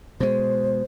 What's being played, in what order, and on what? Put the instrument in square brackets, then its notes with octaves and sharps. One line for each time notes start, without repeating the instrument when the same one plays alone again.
[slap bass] B2 G#3 [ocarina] C5